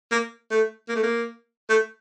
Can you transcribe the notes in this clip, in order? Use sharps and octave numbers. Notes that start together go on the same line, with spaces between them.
A#3
A3
A#3
A3
A#3
A3